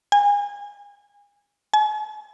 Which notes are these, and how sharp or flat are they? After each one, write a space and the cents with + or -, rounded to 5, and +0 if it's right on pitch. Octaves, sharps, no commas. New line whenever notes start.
G#5 -30
G#5 +40